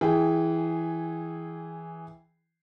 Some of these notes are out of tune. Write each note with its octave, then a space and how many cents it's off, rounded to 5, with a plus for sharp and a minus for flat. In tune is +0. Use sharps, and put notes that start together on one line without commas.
E3 +0 G#4 +0 G5 +0